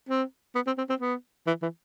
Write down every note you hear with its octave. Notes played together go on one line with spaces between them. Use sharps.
C4
B3
C4
C4
C4
B3
E3
E3